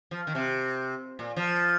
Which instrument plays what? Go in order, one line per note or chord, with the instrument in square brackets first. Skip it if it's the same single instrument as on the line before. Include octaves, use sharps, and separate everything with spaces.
[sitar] F3
D#3
C3
A#2
F3